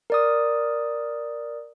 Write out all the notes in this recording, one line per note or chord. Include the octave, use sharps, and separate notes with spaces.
A#4 D5 D#6